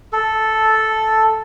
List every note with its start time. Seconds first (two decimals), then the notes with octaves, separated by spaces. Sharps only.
0.13 A4